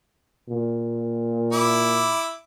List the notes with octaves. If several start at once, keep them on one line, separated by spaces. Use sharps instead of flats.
A#2
E4 D6